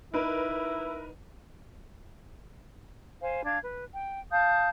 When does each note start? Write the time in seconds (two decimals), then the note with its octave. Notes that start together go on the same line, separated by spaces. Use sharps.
0.14 D#4 E4 A#4 B4
3.21 C5 F5 G#5
3.44 D4 F5 G#6
3.63 B4
3.93 G5
4.31 F5 A5 D#6 G6